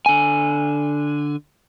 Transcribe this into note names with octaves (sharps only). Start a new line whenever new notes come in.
D3 G#5